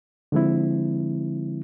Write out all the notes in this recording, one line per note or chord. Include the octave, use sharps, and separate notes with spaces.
D3 F3 G#3 C4 E4